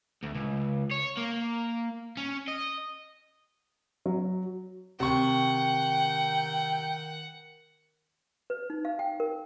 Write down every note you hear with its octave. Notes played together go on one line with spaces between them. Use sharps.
D2
C#2
C#5
A#3
C#4
D#5
F#3
C3 D#3 F#5 G5 C#6
B4
D#4
F5
G5
A#4